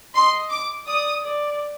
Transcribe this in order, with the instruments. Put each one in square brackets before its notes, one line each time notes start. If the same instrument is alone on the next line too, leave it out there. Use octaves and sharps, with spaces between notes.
[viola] D#5 [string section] C6
[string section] D6
[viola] D5 [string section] D#6
[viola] D5